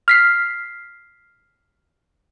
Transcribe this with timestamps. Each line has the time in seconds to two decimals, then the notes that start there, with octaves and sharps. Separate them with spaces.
0.08 F6 B6 C7